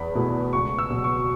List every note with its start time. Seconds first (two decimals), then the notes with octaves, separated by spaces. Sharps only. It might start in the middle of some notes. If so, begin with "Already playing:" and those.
Already playing: E2 B5
0.15 B2 A3 E4
0.53 C#2 C#6
0.79 E6
0.90 B2 F#3
1.04 C#6